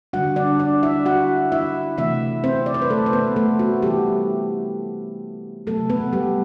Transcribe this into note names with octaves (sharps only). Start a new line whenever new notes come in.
D3 G3 D4 F#4 F#5
D4 D5
D4 D5
E4 E5
F#4 F#5
E4 E5
C3 E3 A3 C4 E4 E5
C4 C5
D5
C5
B4
A3 A4
C5
B3 B4
A3 A4
F#4
E3 G3 B3 E4 G4
C3 F#3 A3 B3 A4
B3 B4
G3 G4